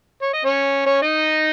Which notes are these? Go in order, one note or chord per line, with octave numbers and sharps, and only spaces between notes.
C#5
D#5
C#4 C#5
C#4 C#5
D#4 D#5